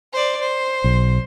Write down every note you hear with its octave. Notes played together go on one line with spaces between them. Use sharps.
C5 D5
C5
B1